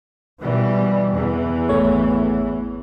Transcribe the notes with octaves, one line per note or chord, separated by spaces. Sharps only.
B2 E3 G3
E2 E3
G#1 A3 C#5